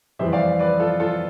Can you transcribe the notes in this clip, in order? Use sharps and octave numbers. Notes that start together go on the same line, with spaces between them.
F2 C3 E3 G3 C5 E5
D5 F5
B4 D5
F4 A4
F4 A4